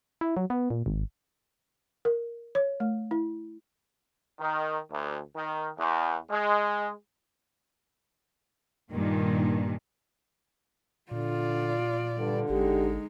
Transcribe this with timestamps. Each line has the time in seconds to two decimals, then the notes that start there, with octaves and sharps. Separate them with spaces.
0.21 E4
0.37 F#3
0.50 B3
0.70 A#2
0.86 G#1
2.05 A#4
2.55 C#5
2.80 A3
3.11 E4
4.40 D#3
4.91 D2
5.36 D#3
5.79 E2
6.31 G#3
8.92 G2 A#2 D#3
11.11 A#2 D3 F4 D5
12.19 G2 D3
12.50 G#1 G#3 D#4 G4